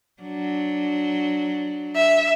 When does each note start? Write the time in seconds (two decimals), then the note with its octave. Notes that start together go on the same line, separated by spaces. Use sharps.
0.22 F#3 D4
1.96 E5